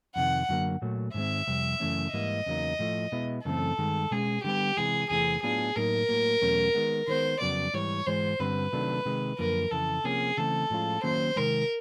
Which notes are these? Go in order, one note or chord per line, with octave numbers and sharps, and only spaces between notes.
F2 C3 D#3 F#5
F#2 D3 F#3 A#3
A#2 F#3 A3
G#2 D#3 G#3 C4 E5
F2 C3 G3
F#2 C#3 E3 A3 C#4
G#2 E3 G3 A#3 D#5
E2 C#3 F#3 A#3 D#4
A2 F3 A3
B2 G#3 B3 E4
F#2 C#3 E3 A3 C4 A4
G2 D#3 G#3
B2 G#3 C#4 G#4
D3 G3 B3 G4
C3 E3 G#3 G#4
E2 C3 E3 A3 C4 G#4
A2 F#3 B3 D4 F4 G#4
A2 F#3 A#3 D#4 A#4
A2 F#3 A#3
E2 B2 F#3 A3 C#4
D#3 G#3 B3
D#3 G#3 B3 C5
F2 C#3 F#3 B3 D5
G#2 E3 G3 C#5
G#2 E3 G#3 C5
G2 D3 G3 C4 B4
C3 D#3 F#3 A3 D4
C3 D#3 G#3
F#2 D3 F3 A#3 A#4
F2 C#3 E3 A4
C3 F3 A#3 C#4 G#4
C#3 E3 A3 C4 A4
A2 F3 G#3 C#4 F4
D#3 F#3 A#3 C#4 C5
C3 D#3 G#3 A#4